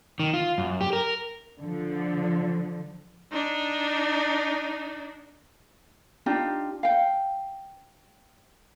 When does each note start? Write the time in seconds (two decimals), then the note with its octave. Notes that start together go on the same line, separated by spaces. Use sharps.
0.20 D#3
0.34 F4
0.58 F#2
0.81 G4
0.93 A#4
1.59 D3 F3
3.32 D4 D#4
6.26 D4 D#4 F4 G4
6.83 F5 G5